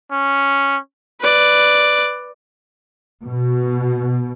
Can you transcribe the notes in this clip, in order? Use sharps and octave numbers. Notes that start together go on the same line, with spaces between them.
C#4
B4 D5
B2